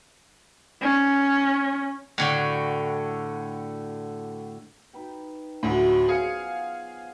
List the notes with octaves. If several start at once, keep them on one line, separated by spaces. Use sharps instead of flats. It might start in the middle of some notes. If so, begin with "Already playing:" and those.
C#4
A2 D3 F#4
D#4 B4 G5
D2 A2 F#3 C#4 F#4
B3 F4 G#4 C5 F5 C#7